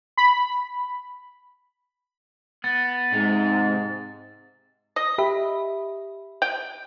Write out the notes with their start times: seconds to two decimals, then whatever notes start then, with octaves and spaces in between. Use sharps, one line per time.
0.17 B5
2.64 B3 A6
3.13 G#2 C3
4.96 D#5
5.18 G4 E5 B5
6.42 G5